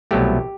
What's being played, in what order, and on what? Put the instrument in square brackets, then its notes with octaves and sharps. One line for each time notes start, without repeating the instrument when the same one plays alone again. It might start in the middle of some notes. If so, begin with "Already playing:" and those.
[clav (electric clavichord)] C2 B2 F#3 A3 G4